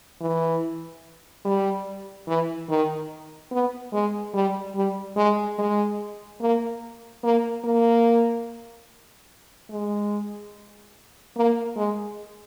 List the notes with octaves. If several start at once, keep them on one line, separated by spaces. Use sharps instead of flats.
E3
G3
E3
D#3
B3
G#3
G3
G3
G#3
G#3
A#3
A#3
A#3
G#3
A#3
G#3